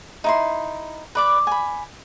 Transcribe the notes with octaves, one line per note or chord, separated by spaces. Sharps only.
D#4 E4 C6
B4 D5 D6
G#5 B5